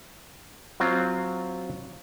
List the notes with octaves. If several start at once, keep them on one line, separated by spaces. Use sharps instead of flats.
F#3 C4 F4